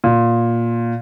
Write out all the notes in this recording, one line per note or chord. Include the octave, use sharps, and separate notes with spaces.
A#2